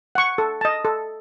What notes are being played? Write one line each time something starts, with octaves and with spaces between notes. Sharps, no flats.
F#5 C#6
A4
D#5 A5
A4